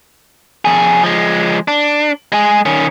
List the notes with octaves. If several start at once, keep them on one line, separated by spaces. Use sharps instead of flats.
F2 G#4
F3 G#3
D4
G#3 G#4
D#3 C#4